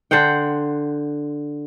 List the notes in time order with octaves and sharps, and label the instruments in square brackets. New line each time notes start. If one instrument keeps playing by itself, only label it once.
[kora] D3 C5 F#5 G5